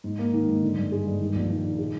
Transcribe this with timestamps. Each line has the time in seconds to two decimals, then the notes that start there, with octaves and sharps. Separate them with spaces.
0.04 G#2
0.18 A#3
0.34 D#3
0.48 G#2
0.62 D3
0.76 G2
0.92 G#3
1.06 G2
1.20 D#3
1.35 A#1
1.49 D#3
1.64 D#3
1.78 G#3